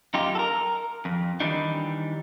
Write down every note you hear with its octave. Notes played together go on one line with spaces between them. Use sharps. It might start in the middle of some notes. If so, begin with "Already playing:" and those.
F#2 D#4 F4 G4
A4 A#4
F2
D#3 E3 G3 D4 D#4